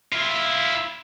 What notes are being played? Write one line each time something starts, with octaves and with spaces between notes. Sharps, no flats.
E4 F4